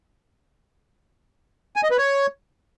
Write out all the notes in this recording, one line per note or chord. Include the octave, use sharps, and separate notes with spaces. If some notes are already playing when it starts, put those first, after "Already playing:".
G#5
D#5
B4
C#5